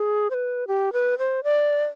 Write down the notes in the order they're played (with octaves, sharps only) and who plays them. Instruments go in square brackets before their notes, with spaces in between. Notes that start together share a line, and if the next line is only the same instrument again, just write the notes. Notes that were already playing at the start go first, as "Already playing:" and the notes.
Already playing: [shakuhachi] G#4
C5
B4
G4
B4
C5
D5